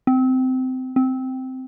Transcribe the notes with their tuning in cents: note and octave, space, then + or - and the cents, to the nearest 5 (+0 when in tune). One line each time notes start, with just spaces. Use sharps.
C4 -20
C4 -10